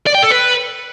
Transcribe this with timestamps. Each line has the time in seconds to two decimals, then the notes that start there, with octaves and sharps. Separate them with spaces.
0.07 D5
0.15 G5
0.23 A4
0.31 B4